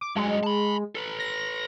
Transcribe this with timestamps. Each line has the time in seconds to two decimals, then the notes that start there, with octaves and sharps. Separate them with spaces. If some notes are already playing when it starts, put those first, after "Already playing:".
0.01 D6
0.16 G2 F#3 G#3
0.43 A5 B5
0.95 A4 B4
1.19 A#6